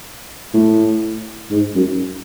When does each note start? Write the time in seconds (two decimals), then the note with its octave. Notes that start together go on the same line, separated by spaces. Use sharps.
0.53 A2
1.51 G#2
1.75 F#2